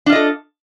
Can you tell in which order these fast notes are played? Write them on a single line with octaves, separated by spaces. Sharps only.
D4 F4 D#5 A4